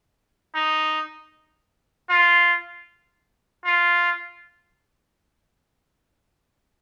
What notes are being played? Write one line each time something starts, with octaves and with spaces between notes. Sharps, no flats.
D#4
F4
F4